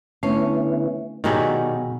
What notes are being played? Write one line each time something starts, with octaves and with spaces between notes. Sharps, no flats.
D3 A3 B3 C#4 E4
B2 D#3 F#3 G3 D#4 F#4 G#4